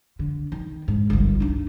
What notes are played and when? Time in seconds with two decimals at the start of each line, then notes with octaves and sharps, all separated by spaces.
0.19 D3
0.52 D#3
0.88 G#2
1.10 G1 C2
1.40 D4 D#4